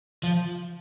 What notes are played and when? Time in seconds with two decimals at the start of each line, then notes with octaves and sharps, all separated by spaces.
0.23 F3